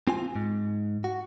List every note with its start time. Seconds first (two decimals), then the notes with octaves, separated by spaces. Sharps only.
0.07 C4 F4 G#5
0.36 G#2
1.04 F#4